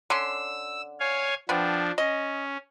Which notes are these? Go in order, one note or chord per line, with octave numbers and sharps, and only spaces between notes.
D3 C#4 C6 E6
C#5 F5 G#5
F3 B3 C4 D4
C#4 D#5